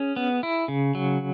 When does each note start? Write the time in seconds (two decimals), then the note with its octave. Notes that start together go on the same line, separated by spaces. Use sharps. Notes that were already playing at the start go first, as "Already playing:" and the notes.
Already playing: C#4 G#4
0.16 B3
0.43 E4
0.68 C#3
0.95 F#3